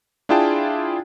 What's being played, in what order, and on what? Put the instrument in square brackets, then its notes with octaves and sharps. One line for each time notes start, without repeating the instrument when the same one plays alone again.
[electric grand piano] D4 E4 F4 G#4 G5 A5